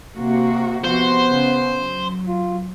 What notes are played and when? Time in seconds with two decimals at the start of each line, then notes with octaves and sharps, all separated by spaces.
0.17 C3 A#3 F#4
0.84 C3 F3 B3 F#4 C5
1.29 C#3
1.77 F#3
2.27 F4